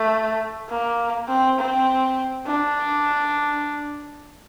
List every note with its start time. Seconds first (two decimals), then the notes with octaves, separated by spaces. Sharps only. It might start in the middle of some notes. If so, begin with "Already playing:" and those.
Already playing: A3
0.69 A#3
1.28 C4
1.59 C4
2.47 D4